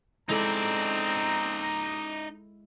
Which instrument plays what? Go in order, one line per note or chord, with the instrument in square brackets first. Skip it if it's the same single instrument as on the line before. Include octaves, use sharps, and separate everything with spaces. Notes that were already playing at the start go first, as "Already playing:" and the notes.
[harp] G#3 E4 A4 [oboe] C4 [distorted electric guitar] D#4 D5 [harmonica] A#5